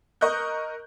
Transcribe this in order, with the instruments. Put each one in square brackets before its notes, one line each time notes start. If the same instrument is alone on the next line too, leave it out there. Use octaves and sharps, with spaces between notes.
[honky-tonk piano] A#4 D#5 C#6 F#6 G6